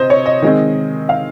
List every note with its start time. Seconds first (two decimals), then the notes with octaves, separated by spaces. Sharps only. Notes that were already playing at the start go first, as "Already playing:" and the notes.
Already playing: C3 C5 D#5
0.10 C#5
0.26 D#5
0.42 D#3 G#3 C4
1.09 F5